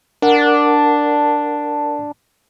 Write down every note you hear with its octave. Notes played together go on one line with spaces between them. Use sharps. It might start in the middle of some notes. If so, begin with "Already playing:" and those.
D4 A#4 F#5